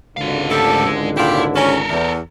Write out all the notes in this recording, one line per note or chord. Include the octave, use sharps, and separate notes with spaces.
G#1 C#2 D3 F#4 F5
G#2 A3 F4 G4 A4
G#3
A#2 E4 F4 G4
C#4 A4 A#4
E2